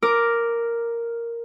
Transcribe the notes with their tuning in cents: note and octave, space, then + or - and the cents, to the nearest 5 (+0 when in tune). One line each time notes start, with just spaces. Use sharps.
A#4 +0 D6 +0